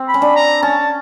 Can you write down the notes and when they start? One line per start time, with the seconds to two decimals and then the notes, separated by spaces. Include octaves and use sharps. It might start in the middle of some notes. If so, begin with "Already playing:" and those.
Already playing: C4
0.08 B5
0.14 C#4
0.22 D4
0.36 A#5
0.62 C#4 A5